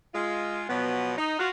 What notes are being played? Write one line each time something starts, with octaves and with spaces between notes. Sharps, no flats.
G#3 F4
B2 F3 F#3 B3
D#4
F4 F#4